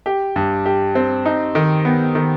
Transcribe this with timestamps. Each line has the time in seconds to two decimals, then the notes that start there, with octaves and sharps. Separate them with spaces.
0.06 G4
0.36 G2
0.66 G4
0.95 C4
1.26 D#4
1.55 D#3
1.85 B3
2.15 D#3